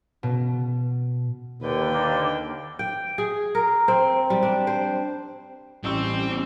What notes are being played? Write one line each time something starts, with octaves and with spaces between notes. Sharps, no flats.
B2
D#2 D3 B4 G5
D3 A#3 D4
G5
G#4
A#4
C4
G3
D4
C5
A1 G3 C4 C#4 C#6 E6